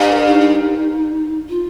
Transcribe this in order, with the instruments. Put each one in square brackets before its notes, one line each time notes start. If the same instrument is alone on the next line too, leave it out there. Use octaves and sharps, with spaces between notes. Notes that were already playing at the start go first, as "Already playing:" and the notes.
Already playing: [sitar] G2
[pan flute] A#4
D#4
F4